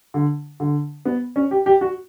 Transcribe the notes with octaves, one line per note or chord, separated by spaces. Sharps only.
D3
D3
B3
C#4
G4
G4
F#4